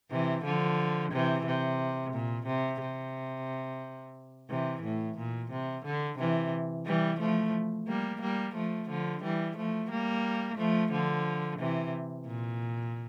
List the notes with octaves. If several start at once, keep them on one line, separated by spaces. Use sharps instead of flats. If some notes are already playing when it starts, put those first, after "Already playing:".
C3 E3
D3 F3
C3 E3
C3
A#2
C3
C3
C3 E3
A2
A#2
C3
D3
C3 E3
E3 G3
F3 A3
G3 A#3
G3 A#3
F3 A3
D3 F3
E3 G3
F3 A3
G3 A#3
F3 A3
D3 F3
C3 E3
A#2